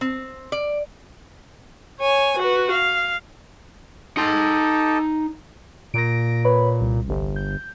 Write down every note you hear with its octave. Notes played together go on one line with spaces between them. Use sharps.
C4
D5
C#5 G#5
F#4 B4
F5
D#4 G4 A4 D#5 C6
A#2 A#6 D7
B4 C#5 B5
C2
G1
G6